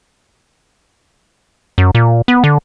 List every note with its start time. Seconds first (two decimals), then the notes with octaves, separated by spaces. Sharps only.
1.78 F#2
1.95 A#2
2.28 B3
2.44 D3